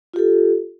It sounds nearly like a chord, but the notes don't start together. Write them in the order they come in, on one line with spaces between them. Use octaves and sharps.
F4 G4 A4